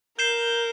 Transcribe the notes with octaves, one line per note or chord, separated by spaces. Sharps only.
A#4 G6 C7 E7 G7